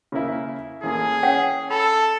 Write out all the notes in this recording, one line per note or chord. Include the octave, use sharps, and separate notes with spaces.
C#3 A#3 E4
A1 A#3 G#4
C#4 C#5 F#5 G5
A4 B5